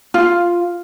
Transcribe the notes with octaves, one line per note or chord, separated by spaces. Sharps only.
F4